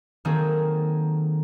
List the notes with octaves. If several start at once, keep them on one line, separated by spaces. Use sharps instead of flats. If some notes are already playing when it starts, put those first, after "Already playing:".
D#3 F#3 A#3 C4 G#4 A4